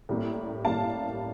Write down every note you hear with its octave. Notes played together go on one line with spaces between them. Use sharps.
A2 G3 A#3
A2 G3 A#3 F5 A5